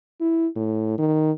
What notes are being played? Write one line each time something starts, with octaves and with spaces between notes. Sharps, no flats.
E4
A2
D#3